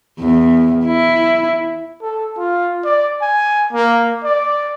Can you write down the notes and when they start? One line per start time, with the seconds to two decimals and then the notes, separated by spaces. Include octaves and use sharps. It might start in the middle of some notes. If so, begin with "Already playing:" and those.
0.19 E2
0.86 E4
2.02 A4
2.38 F4
2.84 D5
3.21 G#5
3.73 A#3
4.24 D5